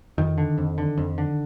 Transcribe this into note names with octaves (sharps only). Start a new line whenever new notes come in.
F2 D#3
D3
F2
D3
F2
D3